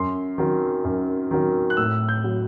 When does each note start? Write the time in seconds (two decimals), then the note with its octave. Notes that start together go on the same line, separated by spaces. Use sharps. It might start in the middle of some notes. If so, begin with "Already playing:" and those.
Already playing: F#2 C6
0.38 D#3 F#3
0.84 F#2
1.31 D#3 F#3
1.70 F#6
1.77 A2 E6
2.09 G6
2.24 F#3